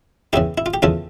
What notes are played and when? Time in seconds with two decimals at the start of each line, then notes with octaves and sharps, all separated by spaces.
0.33 E2 C#3 E3 E4 G4
0.58 E4
0.66 F4
0.74 G4
0.82 E2 C#3 E3 F4 A4